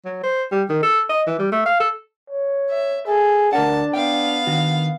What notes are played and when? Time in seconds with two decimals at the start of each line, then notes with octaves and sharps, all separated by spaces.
0.05 F#3
0.24 C5
0.52 G3
0.69 D#3
0.83 A4
1.09 D#5
1.27 E3
1.39 G3
1.52 A3
1.66 F5
1.80 A4
2.30 C#5
2.70 E5
3.07 G#4 A4
3.53 D2 D4 A#4 F#5 A5
3.93 B3 F5 G5
4.47 D#3 D4 F#4